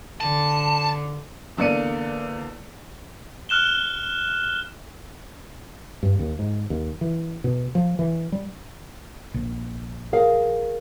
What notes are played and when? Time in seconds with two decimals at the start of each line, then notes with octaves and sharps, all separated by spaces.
0.20 D3 A5
1.57 E2 D3 A#3 D5 C#7 D#7
3.49 F6 F#6 E7 G7
6.03 G2
6.19 D#2
6.39 G#2
6.70 D#2
7.01 E3
7.44 B2
7.75 F3
7.99 E3
8.32 G3
9.34 A#1
10.13 G#4 A#4 F5